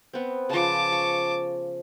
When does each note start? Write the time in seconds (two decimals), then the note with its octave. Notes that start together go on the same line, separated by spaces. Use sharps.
0.13 B3 C4
0.50 C#3 F3 A5 D6
0.92 C#6